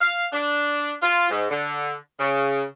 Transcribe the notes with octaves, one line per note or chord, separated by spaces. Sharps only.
F5
D4
F4
G#2
D3
C#3